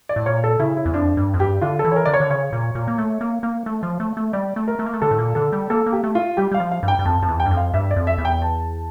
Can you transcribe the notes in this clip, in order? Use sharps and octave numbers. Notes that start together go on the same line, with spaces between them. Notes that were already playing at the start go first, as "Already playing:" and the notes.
D5
A2
A#2 C#5
A4
C#3 E4
E4
E2
F2 D4
G2
F2
G2 G4
D3 F4
A4
E3
C#5
A#4
D3 D5
C#5
D3
C#3 C#5
A#2
A#2
A#3
A3
A#3
A#3
A3
F3
A3
A3
G3 D5
A3
A#4
A3
A#3
A3
D3 A4
A2
A#2
D3 A4
G3
A#3 A4
A#3
G4
A3
F4
G3 G4
G3 F5
F3
F5
G2
G5
G2
F2 A5
F2 A5
E2
G5
G2
F2
F5
G2 E5
D5
F2
E5
E2
G5
A5